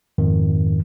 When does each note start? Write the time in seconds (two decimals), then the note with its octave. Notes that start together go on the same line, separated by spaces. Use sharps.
0.18 F2 G#2 D#3